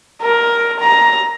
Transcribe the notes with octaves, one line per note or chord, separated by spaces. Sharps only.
A#4
A#5